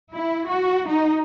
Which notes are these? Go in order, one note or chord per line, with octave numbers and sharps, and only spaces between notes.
E4
F#4
D#4